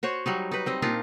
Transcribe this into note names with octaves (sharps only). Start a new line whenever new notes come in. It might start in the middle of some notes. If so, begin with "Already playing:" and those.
F#4 C5 C#5
F#3 G3 D#4
D#4 B4
G3 C4 D#5
A#2 D4 D#4 F4